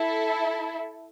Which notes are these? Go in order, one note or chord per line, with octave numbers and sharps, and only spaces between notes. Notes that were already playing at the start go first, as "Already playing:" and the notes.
Already playing: E4 A4